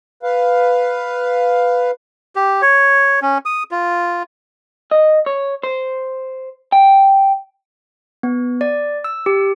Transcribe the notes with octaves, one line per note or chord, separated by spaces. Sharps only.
B4 F5
G4
C#5
C#4
D#6
F4
D#5
C#5
C5
G5
B3
D5
E6
G4